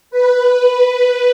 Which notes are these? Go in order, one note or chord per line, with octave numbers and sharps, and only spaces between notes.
B4